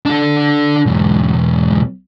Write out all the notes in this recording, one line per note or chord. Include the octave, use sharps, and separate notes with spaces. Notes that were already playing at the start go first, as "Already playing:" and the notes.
D4 A4
B1 E2